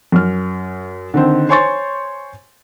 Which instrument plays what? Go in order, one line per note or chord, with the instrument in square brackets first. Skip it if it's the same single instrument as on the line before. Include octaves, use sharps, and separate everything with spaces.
[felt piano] F#2 F6
D3 D#3 C4
C5 C#5 G#5 C6 C#6 A6